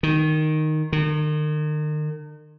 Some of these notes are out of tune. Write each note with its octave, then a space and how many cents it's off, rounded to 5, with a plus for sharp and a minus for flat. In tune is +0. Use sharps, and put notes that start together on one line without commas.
D#3 -5
D#3 -40